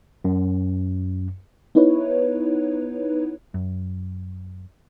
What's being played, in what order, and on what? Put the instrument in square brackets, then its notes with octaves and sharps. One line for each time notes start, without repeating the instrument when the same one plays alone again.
[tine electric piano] F#2
[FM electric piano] B3 D#4 E4 B4 C#5
[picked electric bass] F#2